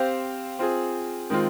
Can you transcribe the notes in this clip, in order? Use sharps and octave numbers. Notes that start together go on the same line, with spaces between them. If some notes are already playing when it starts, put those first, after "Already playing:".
Already playing: C4 G4 C5 F5
C4 F4 G#4
D#3 G#3 C4 F4